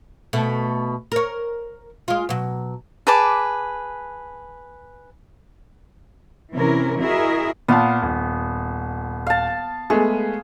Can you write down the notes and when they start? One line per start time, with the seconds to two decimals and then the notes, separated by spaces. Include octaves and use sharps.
0.33 B2 A3
1.12 A#4 C#5
2.08 G#3 F4
2.29 B2 F#3
3.07 G#4 B4 A5 D6
6.52 C3 E3 C#4 E4 A#4
6.99 E4 F#4 G#4 A#4 D#5 E5
7.68 A#2 B3 F5 A5
8.02 D#1
9.27 F5 A5
9.90 G#3 A3 B3 G#4